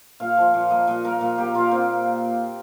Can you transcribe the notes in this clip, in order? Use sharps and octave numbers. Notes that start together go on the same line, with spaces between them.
A#2 F5
F3
A#2
A#3 D#5
A#2 D#5
A#3 A#4
A#2
A#3 G4
A#2 F4
A#3 C4